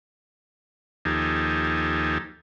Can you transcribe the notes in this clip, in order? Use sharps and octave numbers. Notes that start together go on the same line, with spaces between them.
D#2 F3 D#4 G4 A4 G#5